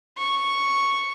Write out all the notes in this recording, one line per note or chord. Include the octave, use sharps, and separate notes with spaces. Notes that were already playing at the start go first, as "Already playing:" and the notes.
C#6